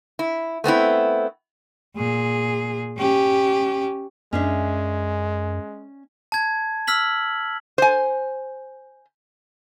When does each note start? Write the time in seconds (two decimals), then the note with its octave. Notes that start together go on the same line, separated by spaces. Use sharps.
0.19 E4
0.64 A3 B3 C4 E4
1.96 A#2 G#4
2.98 C#4 G4
4.33 F#2 G#3 C#4 D4 E5
6.32 A5 G#6
6.87 E6 F6 B6 F#7
7.78 C5 G#5